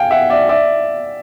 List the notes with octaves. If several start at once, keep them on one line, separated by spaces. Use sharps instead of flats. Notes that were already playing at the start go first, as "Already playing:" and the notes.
Already playing: F5 G5 G#5
E5 F#5
D5 E5
D5 E5